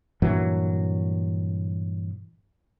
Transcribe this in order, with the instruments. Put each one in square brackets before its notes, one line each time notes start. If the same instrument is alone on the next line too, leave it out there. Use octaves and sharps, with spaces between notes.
[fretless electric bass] G2 A#2 E3 F#3